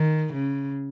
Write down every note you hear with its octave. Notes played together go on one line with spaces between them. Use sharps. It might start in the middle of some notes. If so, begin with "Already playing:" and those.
Already playing: D#3
C#3